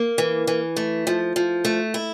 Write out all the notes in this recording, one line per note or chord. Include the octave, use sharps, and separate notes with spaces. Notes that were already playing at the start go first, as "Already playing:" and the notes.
Already playing: A#3
E3
E3
A3
F3
F3
A3
E4